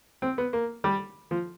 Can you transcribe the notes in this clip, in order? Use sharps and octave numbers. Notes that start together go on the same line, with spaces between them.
C4
B3
A#3
G3
F3